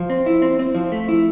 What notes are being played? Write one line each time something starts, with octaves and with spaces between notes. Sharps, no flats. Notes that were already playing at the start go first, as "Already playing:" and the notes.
Already playing: F3
C4
E4
C4
C4
F3
A3
E4